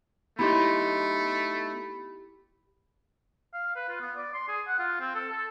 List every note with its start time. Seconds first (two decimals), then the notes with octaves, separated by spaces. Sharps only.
0.39 A3 B3 D#4 E4 G4 D#5 B5 C6
3.54 F5
3.76 B4
3.89 F4
4.01 B3
4.17 D5
4.34 C6
4.49 G#4
4.68 F#5
4.79 F4
5.01 C4
5.15 A4
5.32 A4